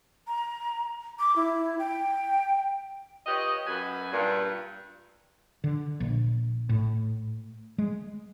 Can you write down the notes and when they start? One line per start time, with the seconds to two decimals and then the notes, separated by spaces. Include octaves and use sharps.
0.27 A#5
1.19 D6
1.36 E4
1.79 G5
3.27 F4 G4 B4 C#5 D#5
3.67 F#2 B4 G#5
4.12 G2 A#2
5.64 D3
6.00 A#1
6.69 A2
7.78 G#3